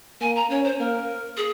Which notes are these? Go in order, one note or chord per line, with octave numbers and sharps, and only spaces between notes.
A#3 G#5
A#5
C#4 C#5
C5
A#3 A#4
G#4